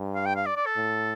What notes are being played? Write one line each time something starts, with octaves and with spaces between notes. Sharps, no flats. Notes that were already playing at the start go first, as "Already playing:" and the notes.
Already playing: G2
F5
G5
F5
D5
D5
A4
A2